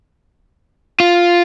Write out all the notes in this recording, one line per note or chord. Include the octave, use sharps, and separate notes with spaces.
F4